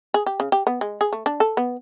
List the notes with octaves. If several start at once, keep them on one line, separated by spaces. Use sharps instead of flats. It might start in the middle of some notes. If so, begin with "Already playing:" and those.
G#4
G4
C#3
G4
B3
G#3
G#4
A3
D4
A4
B3